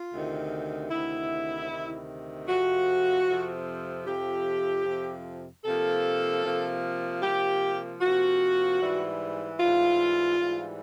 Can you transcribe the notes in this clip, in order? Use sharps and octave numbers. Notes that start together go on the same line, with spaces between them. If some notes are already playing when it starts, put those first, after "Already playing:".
Already playing: F4
D2 C3 D#3
D2 C3 D#3 E4
D2 C3 D#3
F2 C3 F3 F#4
F2 C3 F3
F2 C3 F3 G4
F2 C3 F3
C3 F3 A#3 A4
C3 F3 A#3
C3 F3 A#3 G4
C3 F3 A#3 F#4
G#2 E3 G3
G#2 E3 G3 F4
G#2 E3 G3